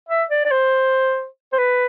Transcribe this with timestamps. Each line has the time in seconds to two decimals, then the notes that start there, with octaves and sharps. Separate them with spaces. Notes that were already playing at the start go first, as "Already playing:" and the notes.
0.08 E5
0.30 D5
0.45 D5
0.51 C5
1.52 C5
1.58 B4